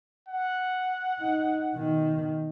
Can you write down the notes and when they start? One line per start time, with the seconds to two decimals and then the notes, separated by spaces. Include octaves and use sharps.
0.29 F#5
1.19 D#4
1.73 B2 D#3